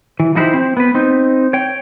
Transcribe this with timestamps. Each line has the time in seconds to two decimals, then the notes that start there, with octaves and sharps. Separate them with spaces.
0.20 E3
0.35 F3 D#4 E4 F#4 G4 C5
0.54 C4
0.77 B3 B4
0.95 C4 D#4
1.53 C#5 G5